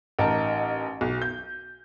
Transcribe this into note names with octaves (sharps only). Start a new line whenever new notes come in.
A1 D#4 A#4 A5
B1
G6